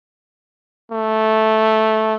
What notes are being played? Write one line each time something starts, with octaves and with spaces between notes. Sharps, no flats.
A3